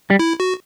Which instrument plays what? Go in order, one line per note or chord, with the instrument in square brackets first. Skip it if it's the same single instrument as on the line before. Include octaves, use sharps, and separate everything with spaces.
[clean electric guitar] G3
[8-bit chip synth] E4
F#4